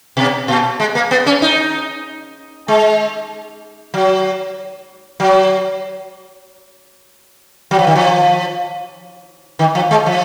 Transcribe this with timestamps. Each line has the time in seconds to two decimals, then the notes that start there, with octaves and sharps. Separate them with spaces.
0.17 B2
0.48 A#2
0.80 G#3
0.95 A#3
1.11 B3
1.26 C#4
1.42 D#4
2.68 G#3
3.94 F#3
5.20 F#3
7.71 F#3
7.79 F3
7.87 D#3
7.95 F3
9.59 D#3
9.75 F3
9.91 G#3
10.06 F3